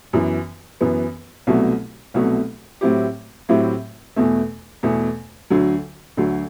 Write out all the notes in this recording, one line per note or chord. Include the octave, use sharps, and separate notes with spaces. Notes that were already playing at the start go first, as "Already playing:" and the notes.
F#2 E3 B3
F#2 E3 B3
C2 B2 F#3 A3
C2 B2 F#3 A3
A2 F#3 C4 E4 G4
A2 F#3 C4 E4 G4
E2 B2 A3
E2 B2 A3
D2 D3 F#3
D2 D3 F#3